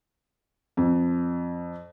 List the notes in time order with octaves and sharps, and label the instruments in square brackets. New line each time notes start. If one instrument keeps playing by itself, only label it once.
[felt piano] F2